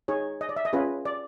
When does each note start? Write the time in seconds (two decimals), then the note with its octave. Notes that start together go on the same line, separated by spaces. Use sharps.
0.08 D#4 G#4 C#5
0.41 D#5
0.49 D5
0.56 E5
0.65 D#5
0.73 C#4 F4 G#4 B4
1.05 D5